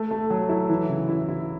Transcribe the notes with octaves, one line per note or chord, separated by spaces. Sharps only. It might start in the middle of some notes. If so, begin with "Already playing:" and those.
Already playing: A3
A3
F#3
E4
E3
C#3
E4
E4